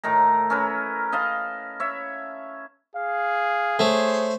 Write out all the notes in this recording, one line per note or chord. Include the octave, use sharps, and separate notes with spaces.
A2 D#3 A#4 A#5
C#4 E4 A#4 B4
D#5 F5 A5 B5
C#5 E5
G#4 F5
A3 C5 C#5